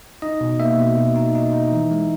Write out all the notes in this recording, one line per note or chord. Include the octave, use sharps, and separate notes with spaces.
D#4 D#5
B2
A#3 E5
B2
B2
D#4
D#4
D#4
E3
G#3